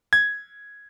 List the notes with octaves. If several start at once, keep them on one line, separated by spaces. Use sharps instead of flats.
G#6